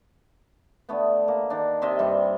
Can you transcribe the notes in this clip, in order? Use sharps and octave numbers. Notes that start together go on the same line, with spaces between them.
D3 A3 B3
A#3
D#3 D4
C3 D#5 E5 C6
G2 G3